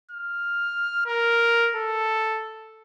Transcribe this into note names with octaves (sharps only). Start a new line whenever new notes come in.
F6
A#4
A4